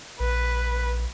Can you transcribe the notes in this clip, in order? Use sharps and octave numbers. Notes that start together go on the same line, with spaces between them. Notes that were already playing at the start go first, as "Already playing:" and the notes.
A#1 B4